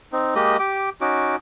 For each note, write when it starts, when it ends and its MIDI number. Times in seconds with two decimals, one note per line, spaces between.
0.13 0.34 60
0.13 0.34 63
0.35 0.57 56
0.35 0.57 58
0.35 0.57 67
0.35 0.57 75
0.59 0.90 67
0.59 0.90 86
1.01 1.36 61
1.01 1.36 63
1.01 1.36 66
1.01 1.36 86